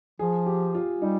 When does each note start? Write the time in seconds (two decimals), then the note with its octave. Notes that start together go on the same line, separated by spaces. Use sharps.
0.19 F3 G#4
0.46 G4
0.75 F4
1.01 G3 D#4